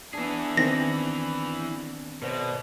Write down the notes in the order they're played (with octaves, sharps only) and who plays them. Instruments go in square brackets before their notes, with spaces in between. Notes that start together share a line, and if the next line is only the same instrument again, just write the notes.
[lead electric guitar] E3 G#4 [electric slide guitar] B3 D4
[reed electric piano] D#3 C4 [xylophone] A#6
[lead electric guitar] B2 [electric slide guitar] B4 C5 D5